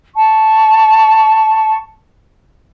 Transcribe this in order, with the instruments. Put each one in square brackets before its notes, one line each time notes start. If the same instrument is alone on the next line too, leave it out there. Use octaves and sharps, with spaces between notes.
[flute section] A5 C#6